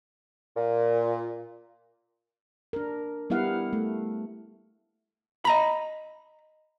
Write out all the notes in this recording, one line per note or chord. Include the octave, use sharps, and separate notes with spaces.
A#2
D4 A#4
G3 B3 E4 F5 F#5
A3
D#5 A#5 B5